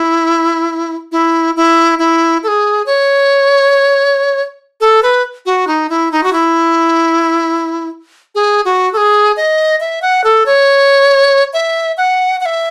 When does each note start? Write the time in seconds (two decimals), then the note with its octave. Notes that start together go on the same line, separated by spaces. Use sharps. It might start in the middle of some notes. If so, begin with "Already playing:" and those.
Already playing: E4
1.12 E4
1.56 E4
1.99 E4
2.43 A4
2.48 G#4
2.86 C#5
4.81 A4
5.03 B4
5.46 F#4
5.67 D#4
5.89 E4
6.12 D#4
6.23 F#4
6.33 E4
8.35 G#4
8.65 F#4
8.93 A4
8.97 G#4
9.37 D#5
9.80 E5
10.02 F#5
10.24 A4
10.46 C#5
11.53 E5
11.97 F#5
12.41 F#5
12.46 E5